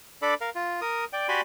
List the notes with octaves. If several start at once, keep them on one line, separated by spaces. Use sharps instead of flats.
D4 A4 D5 B5 D6
A#4 F5
F4
A#4 D#6
D5 G5
F#4 G4 D5 G#5 B5 C6